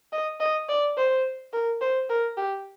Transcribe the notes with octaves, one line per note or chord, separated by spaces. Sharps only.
D#5
D#5
D5
C5
A#4
C5
A#4
G4